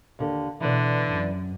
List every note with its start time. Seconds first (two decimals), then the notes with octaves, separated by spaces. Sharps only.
0.19 D#2 D3
0.60 B2 D3 E3 B4 D5
1.09 F#2